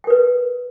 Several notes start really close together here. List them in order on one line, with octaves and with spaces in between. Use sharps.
G5 A#4 B4